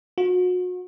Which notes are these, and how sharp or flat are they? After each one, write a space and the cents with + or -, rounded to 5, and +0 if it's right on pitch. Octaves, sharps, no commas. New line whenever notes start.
F#4 -35